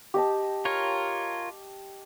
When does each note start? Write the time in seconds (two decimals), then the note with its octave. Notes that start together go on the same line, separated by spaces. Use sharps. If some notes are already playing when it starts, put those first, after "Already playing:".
0.14 G4 D#5 A5
0.65 F4 A#4 C#5